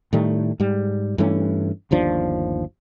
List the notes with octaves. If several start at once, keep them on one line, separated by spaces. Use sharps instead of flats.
A2 D#3 G3 A3
G#2 G3
G2 E3 A3 C#4
G1 D#2 F3 D4